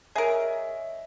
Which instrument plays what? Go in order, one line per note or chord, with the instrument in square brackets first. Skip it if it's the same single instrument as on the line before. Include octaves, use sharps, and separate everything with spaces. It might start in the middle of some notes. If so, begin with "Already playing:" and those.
[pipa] G#4 A#4 [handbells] C#5 D#5 E5